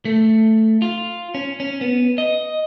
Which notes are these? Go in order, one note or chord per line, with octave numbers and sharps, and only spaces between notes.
A3
F4
C#4
C#4
B3
D#5